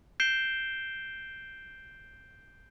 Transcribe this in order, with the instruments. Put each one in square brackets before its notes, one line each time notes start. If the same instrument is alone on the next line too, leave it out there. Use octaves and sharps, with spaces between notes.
[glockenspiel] G6 C7 D7 E7 G7